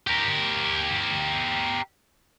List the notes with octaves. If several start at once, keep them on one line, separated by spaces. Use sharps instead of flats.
G4 A#4